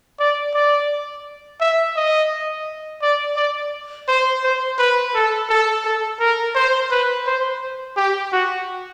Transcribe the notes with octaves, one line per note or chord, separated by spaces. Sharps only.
D5
D5
E5
D#5
D5
D5
C5
C5
B4
A4
A4
A4
A#4
C5
B4
C5
G4
F#4